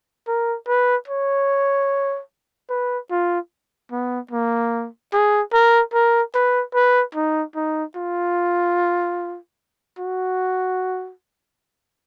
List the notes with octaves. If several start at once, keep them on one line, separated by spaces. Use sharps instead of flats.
A#4
B4
C#5
B4
F4
B3
A#3
G#4
A#4
A#4
B4
B4
D#4
D#4
F4
F#4